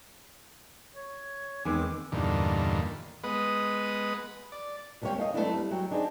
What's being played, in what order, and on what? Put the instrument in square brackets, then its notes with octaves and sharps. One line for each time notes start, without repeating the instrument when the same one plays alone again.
[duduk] C#5
[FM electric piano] E2 D#3 [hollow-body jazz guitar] G#3 B3 G#4 [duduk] C4 [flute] D6
[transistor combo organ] E2 G2 A#2 D3 D#3
G#3 B3 B4 D#6
D5
[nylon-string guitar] D2 C3 G3 A#3 C#5 G5
D#5 F5 A5
F#3 A3 B3 C4 D4 E4
G3
F#3 F#4 G5
D4 D#4 G#4 C5 D5